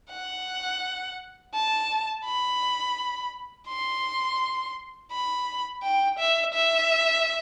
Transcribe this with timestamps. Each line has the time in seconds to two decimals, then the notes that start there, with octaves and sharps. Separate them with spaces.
0.10 F#5
1.54 A5
2.25 B5
3.68 C6
5.11 B5
5.83 G5
6.19 E5
6.54 E5